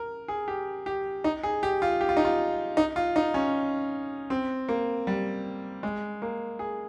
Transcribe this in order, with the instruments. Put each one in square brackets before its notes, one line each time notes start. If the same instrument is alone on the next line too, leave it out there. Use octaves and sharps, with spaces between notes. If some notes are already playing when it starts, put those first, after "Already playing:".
Already playing: [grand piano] A#4
G#4
G4
G4
D#4
G#4
G4
F4
G4
F4
D#4
F4
D#4
F4
D#4
C#4
C4
A#3
G3
G#3
A#3
G#4